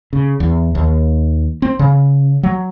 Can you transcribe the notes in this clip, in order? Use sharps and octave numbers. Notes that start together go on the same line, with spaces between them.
C#3
E2
D#2
C4
C#3
F#3